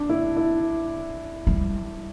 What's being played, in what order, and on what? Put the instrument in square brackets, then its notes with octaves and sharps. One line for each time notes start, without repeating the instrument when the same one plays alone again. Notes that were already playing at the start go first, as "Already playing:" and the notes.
Already playing: [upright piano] D4
E4
E4
[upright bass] G3